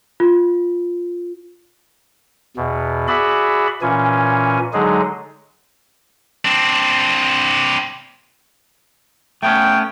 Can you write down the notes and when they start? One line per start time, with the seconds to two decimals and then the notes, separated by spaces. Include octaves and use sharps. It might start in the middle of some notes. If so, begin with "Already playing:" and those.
0.20 F4
2.57 E2 B2
3.08 F#4 G#4 D5 E5 B5
3.82 A#2 E3 C#4 G#5
4.73 D3 F#3 G#3 D#4 G#4
6.45 C4 D4
9.43 A3 B3 C#4 G5